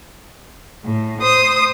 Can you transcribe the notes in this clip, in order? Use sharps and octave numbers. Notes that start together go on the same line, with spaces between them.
A2
C5 D#6